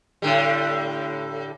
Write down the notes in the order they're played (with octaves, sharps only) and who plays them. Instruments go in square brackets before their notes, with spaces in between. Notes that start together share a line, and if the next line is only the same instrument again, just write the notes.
[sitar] A2 D3 G3